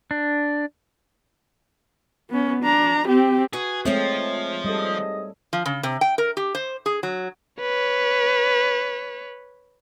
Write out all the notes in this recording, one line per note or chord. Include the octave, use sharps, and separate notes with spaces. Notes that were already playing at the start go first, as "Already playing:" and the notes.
D4
B3 C#4
D4 A#5
C4 G4
F#4 G#4 B4
F3 G#3 A3 C4 G#4 C#5 E5
G#2 G3 A4 D#5 D#6
F3
C#3
C3
G5
A#4
G4
C5
G#4
F#3
B4 C#5